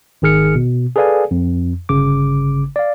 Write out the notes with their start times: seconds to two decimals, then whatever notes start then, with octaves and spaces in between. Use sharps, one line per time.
0.22 G#1 D#3 G#4 F6 C#7
0.55 B2
0.96 G#4 A4 B4 D5 F5 G#5
1.31 F2
1.89 G1 C#3 D6
2.76 D5 F5